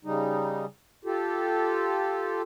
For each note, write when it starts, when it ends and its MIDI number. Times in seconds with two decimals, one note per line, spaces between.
0.05 0.65 49
0.05 0.65 55
0.05 0.65 63
1.05 2.42 65
1.05 2.42 67
1.05 2.42 69